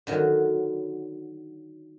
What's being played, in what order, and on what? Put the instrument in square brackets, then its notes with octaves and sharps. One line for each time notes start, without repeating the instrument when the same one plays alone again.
[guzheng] D3 D#3 F#3